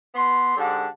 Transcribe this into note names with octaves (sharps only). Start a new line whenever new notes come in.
B3 C6
G#2 D3 G4 F#5 A5